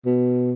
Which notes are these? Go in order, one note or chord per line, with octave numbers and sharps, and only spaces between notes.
B2